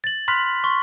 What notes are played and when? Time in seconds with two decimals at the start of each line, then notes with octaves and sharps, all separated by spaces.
0.04 A6 F#7
0.28 B5 C6 F6 F#6 B6
0.64 C6 C#6